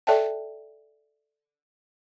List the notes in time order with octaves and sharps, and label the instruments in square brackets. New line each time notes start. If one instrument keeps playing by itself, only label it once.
[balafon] A4 C#5 D5 E5 G5 A5